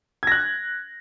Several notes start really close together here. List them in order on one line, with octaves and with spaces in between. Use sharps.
G#6 A#6 F#6